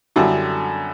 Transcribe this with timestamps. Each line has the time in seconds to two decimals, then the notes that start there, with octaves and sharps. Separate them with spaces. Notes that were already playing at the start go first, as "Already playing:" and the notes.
0.16 F#2 D3 G3 E4 F#4